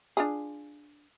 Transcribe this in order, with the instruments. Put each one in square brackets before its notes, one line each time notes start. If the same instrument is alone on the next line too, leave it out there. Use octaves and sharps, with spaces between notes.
[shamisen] D4 F4 G#4